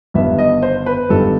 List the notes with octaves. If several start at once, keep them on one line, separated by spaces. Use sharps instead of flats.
G1 G2 D#3 G3 B3 E5
D#5
C5
B4
G1 G2 D#3 G3 B3 A4